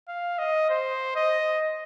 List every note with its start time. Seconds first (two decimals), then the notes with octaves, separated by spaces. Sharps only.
0.08 F5
0.39 D#5
0.70 C5
1.16 D#5